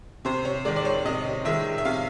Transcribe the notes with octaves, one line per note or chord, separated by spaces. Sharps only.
C3 C5
C#5
D#3 G#3 D5
D5
C#5
C3 D#5
D#3 G#3 E5
E5
C3 F5